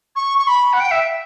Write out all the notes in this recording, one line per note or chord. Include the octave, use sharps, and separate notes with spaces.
C#6
C#6
B5
F#5
G5
E5